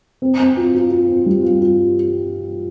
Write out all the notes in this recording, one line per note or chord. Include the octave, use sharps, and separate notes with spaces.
C4
C4
F4
F4
F4
C4
G3
F4
F4